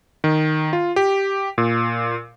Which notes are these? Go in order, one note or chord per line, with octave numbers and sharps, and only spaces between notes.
D#3
F4
G4
A#2